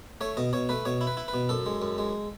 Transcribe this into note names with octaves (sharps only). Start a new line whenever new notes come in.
A3 C#5
B2 D#5
B2 C#5
A3 B4
B2 C#5
E4
B4
E4
B4
B2
F#2 A4
G#3
F#2
G#3